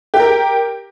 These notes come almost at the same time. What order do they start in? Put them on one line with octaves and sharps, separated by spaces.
G4 G5 A#4